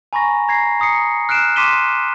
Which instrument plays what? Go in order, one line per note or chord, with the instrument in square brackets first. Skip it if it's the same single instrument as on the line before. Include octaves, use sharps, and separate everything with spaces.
[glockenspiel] G#5 A#5 B5 C#6 A#6
A#5 G#6 A#6 C7
A#5 D#6 C7 C#7
F6 F#6 C7 D7 E7
C6 D6 B6 D#7 E7 G7